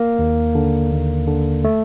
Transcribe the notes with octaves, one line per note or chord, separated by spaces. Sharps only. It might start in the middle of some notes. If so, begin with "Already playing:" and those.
Already playing: A#3
D#2
D3
D#2
D3
A3